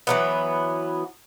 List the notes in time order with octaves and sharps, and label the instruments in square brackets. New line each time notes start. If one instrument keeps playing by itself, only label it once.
[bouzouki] E3 F#3 B3